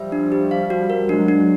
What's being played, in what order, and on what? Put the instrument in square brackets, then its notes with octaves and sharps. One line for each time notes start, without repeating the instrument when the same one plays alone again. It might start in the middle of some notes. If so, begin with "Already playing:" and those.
Already playing: [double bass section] F3 G3 [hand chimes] E5
[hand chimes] D4
G4
F5
F#4
A#4
[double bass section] F#3 G#3 [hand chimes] D4
[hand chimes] D4